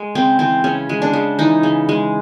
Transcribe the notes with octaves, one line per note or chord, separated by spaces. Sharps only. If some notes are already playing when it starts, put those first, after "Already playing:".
Already playing: G#3
C#3 C4
E3 C4
C#3 C#4
G#3
D4
C#3
E3 D#4
C#3
G#3